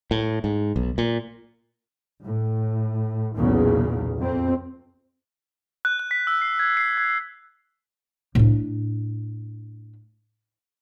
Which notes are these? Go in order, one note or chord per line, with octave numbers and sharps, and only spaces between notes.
A2
G#2
B1
A#2
A2
B1 E2 A#2 C#3
F2 C4
F#6
F#6
B6
E6
C7
G#6
C7
G#6
A2 D4